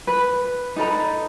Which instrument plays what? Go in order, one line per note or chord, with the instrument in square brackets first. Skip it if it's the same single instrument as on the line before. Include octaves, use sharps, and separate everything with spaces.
[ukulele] B4
D#4 A4 B4 A#5